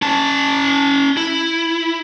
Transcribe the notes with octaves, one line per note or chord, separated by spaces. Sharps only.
C#4 A5
E4